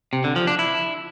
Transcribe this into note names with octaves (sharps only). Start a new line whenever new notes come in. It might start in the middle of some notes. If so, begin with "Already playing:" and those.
C3
D3
F3
D4
E4